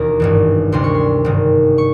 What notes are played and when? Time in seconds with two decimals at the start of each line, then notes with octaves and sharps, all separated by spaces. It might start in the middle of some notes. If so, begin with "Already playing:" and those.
Already playing: E1 D#2 D#3 A#5
0.20 G#1 G2 E3
0.72 D2 C3 D#3 C6
0.84 C#6
0.95 C6
1.24 G#1 G2 D#3
1.78 C#6